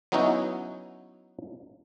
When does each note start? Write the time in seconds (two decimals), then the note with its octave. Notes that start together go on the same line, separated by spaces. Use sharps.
0.12 F#3 B3 C#4 D#4 E4 F#4